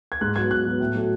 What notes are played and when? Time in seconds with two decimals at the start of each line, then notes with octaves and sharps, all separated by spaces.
0.12 G#6
0.21 G#2 F#6
0.36 F#3 B3 G#6
0.51 G#2 F#6
0.65 F#3 B3
0.80 A2
0.95 F#3 A3